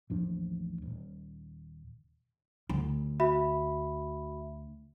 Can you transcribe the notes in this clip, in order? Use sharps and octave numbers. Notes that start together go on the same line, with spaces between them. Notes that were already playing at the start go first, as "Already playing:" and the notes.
A1 D#2 F3 D4
D#1
D2
F#4 E5 B5